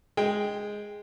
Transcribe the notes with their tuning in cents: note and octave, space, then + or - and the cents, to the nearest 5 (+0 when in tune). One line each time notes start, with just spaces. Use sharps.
G#3 +0 G5 +5